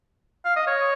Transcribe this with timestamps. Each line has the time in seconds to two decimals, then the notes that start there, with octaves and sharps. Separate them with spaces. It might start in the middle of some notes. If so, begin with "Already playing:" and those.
0.45 F5
0.56 D#5
0.67 C#5